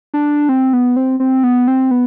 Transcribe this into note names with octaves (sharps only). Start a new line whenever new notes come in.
D4
C4
B3
C4
C4
B3
C4
B3